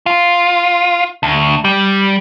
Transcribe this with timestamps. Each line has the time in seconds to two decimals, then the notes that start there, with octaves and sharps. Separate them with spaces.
0.06 F4
1.23 D2
1.65 G3